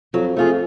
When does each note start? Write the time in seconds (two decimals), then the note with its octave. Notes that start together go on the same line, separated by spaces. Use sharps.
0.14 F2 F#3
0.37 F2 A3 F4 G#4